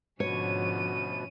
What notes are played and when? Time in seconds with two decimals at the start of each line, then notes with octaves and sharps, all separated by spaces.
0.20 D2 G#2 B2 F3 C#4 C#5 D#7